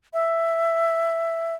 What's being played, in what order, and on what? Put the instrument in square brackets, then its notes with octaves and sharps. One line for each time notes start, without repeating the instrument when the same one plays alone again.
[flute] E5